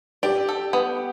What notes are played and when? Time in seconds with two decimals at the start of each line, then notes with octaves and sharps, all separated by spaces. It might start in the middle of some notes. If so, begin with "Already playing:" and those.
0.23 G4 D5
0.49 A4
0.73 B3